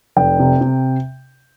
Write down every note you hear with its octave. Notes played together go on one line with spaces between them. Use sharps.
F1 G5
C3
C3